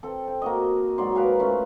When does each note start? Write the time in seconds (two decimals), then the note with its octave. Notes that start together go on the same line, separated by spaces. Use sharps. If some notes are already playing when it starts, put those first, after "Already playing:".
0.03 C4 A4
0.28 G5
0.42 A#3 F#4 D#5
0.98 G#2 F#3 D5 C6
1.15 A#4 B4 F5 G#5
1.39 A3 C#4 F4